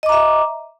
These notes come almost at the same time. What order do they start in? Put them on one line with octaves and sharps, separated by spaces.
D#5 D6 A#5 E5